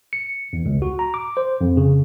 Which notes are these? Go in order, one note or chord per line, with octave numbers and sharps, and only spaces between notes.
C#7
E2
C#2
F#4
A#5
D6
C5
F2
C#3